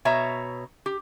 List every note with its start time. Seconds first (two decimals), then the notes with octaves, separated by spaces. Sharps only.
0.05 B2 C#5 E5 A#5
0.86 G4